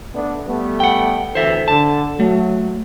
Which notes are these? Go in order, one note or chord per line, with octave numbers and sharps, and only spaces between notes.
A3 B3 D4
G3 A3 B3
F#5 G5
D2 E3 A4 C5 E5
D3 A5
F#3 A3